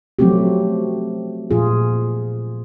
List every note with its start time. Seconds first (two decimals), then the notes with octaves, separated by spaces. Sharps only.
0.19 F3 F#3 A3 C4 F#4 G4
1.51 A#2 F3 F4 G#4